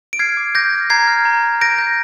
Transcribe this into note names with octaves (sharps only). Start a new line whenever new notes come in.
D7
F6 G#6 C7
D6
D6 G6 A#6
F6
A#5 G#6 C7
F6
A#5
A#5
G6 A#6 D7
G6